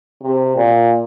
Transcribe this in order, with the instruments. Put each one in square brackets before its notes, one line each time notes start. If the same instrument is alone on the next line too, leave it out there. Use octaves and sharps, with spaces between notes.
[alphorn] C3
A#2